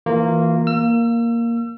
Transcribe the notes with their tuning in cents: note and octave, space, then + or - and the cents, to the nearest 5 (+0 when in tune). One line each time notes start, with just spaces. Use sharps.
E3 +0 A#3 -15 F4 +20
A#3 +0 E6 +35